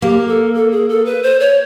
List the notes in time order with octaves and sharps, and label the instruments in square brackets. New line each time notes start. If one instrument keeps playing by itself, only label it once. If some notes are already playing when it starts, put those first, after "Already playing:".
[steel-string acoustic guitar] A#3 [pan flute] G4
[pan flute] A4
A4
G#4
A4
B4
C5
C#5